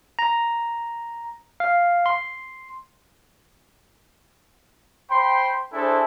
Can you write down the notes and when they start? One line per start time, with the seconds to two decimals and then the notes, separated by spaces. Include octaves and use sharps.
0.19 A#5
1.60 F5
2.06 C6
5.10 C5 G5 B5 C6
5.73 D4 E4 G#4 A4 C5 G#5